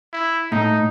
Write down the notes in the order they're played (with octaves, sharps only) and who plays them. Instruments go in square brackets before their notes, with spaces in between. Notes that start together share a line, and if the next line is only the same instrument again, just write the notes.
[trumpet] E4
[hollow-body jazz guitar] A2 [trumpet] D#4